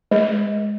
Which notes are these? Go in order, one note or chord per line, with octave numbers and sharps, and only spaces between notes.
G#3